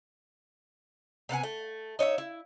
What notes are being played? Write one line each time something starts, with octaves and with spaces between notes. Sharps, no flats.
C3 B3 F#5 G#5
A3
D#4 C#5 D5 E5
E4